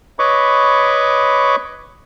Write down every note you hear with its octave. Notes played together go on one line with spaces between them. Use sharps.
B4 C#5 D#5 B5 C#6 D6